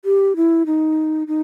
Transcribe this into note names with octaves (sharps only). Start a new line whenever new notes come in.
G4
E4
D#4
D#4